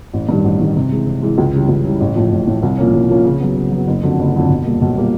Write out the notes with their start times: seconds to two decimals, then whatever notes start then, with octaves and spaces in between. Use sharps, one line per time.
0.13 A1
0.29 G2 D#3 G3
0.44 A1
0.60 G2 D#3 G3
0.76 C3
0.91 E3 G#3
1.06 C3
1.22 E3 G#3
1.38 C#2
1.53 C#3 E3 G3
1.69 C#2
1.85 C#3 E3 G3
2.00 A1
2.16 A2 F3
2.32 A1
2.47 A2 F3
2.63 C2
2.78 A#2 F3 A#3 C#4
2.93 C2
3.09 A#2 F3 A#3 C#4
3.25 C#3
3.40 F#3 B3
3.56 C#3
3.72 F#3 B3
3.88 F#1
4.03 F2 D3 F#3
4.19 F#1
4.34 F2 D3 F#3
4.49 B1
4.65 A#2 G3 A#3
4.81 B1
4.97 A#2 G3 A#3